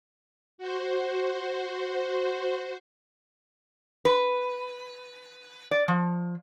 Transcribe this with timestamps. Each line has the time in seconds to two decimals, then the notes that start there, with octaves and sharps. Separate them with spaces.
0.58 F#4 C5
4.05 B4
5.71 D5
5.88 F3